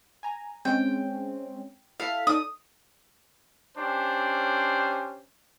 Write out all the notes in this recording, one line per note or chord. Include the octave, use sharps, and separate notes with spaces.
G#5 A#5
G#3 C4 C#4 G5
E4 A4 F5 B6
D#4 A4 D5 D#6
C#4 D4 G4 C5